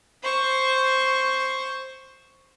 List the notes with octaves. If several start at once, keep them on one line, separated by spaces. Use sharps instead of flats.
C5 C#6